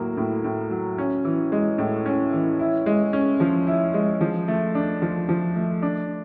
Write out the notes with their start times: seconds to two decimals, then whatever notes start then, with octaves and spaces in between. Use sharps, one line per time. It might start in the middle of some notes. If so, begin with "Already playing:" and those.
Already playing: A2 F#3 A#3
0.17 A2
0.44 A2
0.71 F#3
0.98 C#4
1.25 E3
1.52 G#3
1.78 A2
2.06 C#4
2.33 E3
2.59 E4
2.86 G#3
3.13 C#4
3.40 F3
3.67 E4
3.94 G#3
4.21 F3
4.48 A3
4.75 D4
5.02 F3
5.29 F3
5.56 A3
5.82 D4